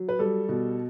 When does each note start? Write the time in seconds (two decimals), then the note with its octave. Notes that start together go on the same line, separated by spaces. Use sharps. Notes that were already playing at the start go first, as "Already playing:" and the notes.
Already playing: F#3
0.09 B4
0.19 G3 A4
0.49 B2